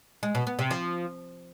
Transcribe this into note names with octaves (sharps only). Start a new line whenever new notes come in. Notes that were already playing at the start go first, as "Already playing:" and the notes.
G#3
B2
B3
C3
F3